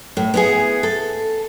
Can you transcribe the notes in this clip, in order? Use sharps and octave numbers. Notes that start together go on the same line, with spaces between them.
A2
B3 E4 G#4
A4